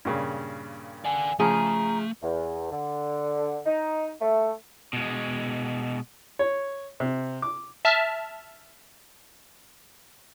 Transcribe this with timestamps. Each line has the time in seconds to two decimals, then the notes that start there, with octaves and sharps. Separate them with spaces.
0.05 G2 A#2 C#3
1.05 D5 F#5 G#5
1.40 C#3 F3 A3 G#4 A#5
2.23 E2
2.72 D3
3.66 D#4
4.21 A3
4.93 B2 G#3
6.39 C#5
7.00 C3
7.42 D6
7.85 E5 A5 F6